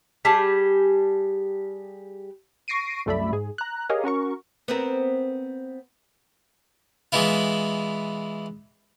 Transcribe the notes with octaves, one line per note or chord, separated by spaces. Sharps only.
G3 G4 G#4 A5
C#6 A#6 C7 D7 D#7
C2 F#2 A3 D5 E5 B5
G#2 G#4
A#5 F#6
G4 G#4 A#4 C#5 D#5 F5
C#4 F#4 A#4 C#6
B3 C4 A#4
E3 G#3 B3 E4 F4